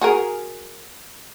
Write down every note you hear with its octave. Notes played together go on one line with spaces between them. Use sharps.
F#4 G#4 A#4